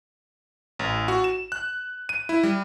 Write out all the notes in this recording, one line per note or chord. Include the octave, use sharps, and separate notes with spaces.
A1
F#4
E7
F#6
D#7
E4
G3